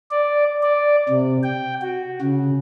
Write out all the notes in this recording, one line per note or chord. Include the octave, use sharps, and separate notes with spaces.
D5
D5
C3
G5
F#4
C#3